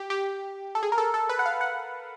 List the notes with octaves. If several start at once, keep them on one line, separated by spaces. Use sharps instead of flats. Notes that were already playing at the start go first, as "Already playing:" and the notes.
Already playing: G4
G4
A4
G#4
A#4
A4
A4
B4
F#5
F5
F#5